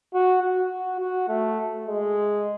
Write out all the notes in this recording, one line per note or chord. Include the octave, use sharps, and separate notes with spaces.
F#4
F#4
F#4
A3
G#3